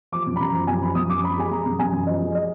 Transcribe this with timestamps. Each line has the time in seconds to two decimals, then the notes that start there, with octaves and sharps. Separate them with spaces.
0.12 F3 D6
0.27 F#2
0.36 B5
0.40 F#2 A#5
0.54 F3
0.67 F#2 G#5
0.81 F3 B5
0.95 F#2 D#6
1.10 F#2 D6
1.23 F3 B5
1.38 G#3 G#5
1.51 G#3 A#5
1.66 F#2
1.79 F#2 G#5
1.93 F#2
2.07 F3 D#5
2.21 G#3
2.35 D#5